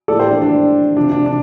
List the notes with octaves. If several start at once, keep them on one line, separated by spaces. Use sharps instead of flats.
A2 F3 A4 D5
G4 C5
D4
D4
C3 F3 D4
D4
D4